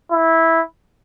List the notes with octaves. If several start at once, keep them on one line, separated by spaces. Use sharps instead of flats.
E4